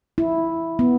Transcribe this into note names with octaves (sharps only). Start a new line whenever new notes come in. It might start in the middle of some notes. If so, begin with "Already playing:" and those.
E4
B3